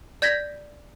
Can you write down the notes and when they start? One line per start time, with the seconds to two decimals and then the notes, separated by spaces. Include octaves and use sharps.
0.22 D5 G6 G#6 A#6 B6